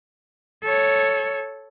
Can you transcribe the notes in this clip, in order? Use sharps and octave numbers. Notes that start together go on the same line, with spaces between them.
A4 C#5